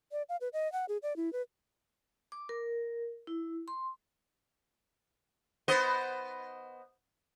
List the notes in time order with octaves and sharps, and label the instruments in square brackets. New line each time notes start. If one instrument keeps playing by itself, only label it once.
[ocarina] D5
F5
B4
D#5
F#5
G#4
D5
E4
B4
[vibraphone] D6
A#4
E4
C6
[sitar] B3 C5 D#5